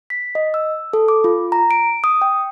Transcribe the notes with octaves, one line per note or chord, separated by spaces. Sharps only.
B6
D#5
E6
A4
D6
F4
A#5
D7
D#6
G5